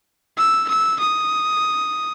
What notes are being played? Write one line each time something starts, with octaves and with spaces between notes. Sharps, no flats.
E6
E6
D#6